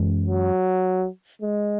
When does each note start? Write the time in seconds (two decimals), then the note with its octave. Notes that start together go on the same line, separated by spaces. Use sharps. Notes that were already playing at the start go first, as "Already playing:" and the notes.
Already playing: F#2 E3 G#3 C#4
0.27 F#3
1.42 G#3